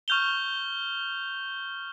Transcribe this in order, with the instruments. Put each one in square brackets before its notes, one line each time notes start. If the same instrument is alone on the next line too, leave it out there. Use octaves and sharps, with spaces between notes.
[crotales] C#6 F6 G6 F7 G7